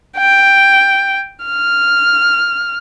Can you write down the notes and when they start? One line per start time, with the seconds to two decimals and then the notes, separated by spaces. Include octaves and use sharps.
0.18 G5
1.45 F6